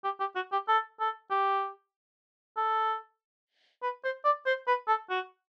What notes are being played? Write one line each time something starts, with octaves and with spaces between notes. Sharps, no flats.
G4
G4
F#4
G4
A4
A4
G4
A4
B4
C5
D5
C5
B4
A4
F#4